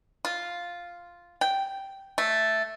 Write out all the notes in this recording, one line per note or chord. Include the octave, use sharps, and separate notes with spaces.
F4
G5
A3